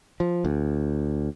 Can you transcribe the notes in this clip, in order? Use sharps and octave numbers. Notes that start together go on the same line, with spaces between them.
F3
D2